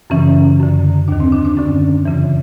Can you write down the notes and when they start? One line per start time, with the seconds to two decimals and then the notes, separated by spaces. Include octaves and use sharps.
0.10 F#2 C#3 E3 C#4
0.60 F#2 D3
1.08 D#2 D#3 D4
1.20 C4
1.32 D4
1.45 D4
1.57 F#2 D3 C#4
2.05 F2 C#3 E3